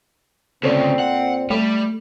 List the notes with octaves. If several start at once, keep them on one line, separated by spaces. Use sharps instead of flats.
D2 A#2 C#3 C4 A4 C5 D5
F#5
G3 A3